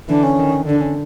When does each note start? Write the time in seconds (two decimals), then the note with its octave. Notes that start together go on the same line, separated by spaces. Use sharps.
0.08 D3 E3 D4
0.23 C#4
0.38 D#3
0.66 D3 D4
0.81 C#4